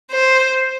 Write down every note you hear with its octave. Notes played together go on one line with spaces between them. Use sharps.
C5